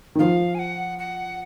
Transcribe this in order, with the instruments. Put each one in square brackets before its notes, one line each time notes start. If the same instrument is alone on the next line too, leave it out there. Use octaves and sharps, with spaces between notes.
[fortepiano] D#3
[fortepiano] F3 [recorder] F5
[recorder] G#5
F#5
F#5